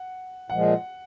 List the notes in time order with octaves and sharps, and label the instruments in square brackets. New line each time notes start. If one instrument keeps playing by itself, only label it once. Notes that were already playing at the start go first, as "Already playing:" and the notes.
Already playing: [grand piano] F#5
[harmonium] A#2 F3 G#3 [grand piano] F#5